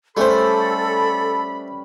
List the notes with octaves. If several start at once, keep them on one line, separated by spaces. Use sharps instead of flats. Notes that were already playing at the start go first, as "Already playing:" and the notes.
G3 A3 C#4 A4 B4 C5 B5